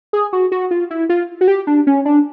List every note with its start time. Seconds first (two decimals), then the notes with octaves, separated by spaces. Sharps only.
0.13 G#4
0.33 F#4
0.52 F#4
0.71 F4
0.90 E4
1.09 F4
1.41 F#4
1.48 G4
1.67 D4
1.87 C#4
2.05 D4